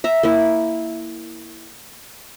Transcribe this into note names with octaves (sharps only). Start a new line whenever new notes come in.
E5 A#5
A#3 E4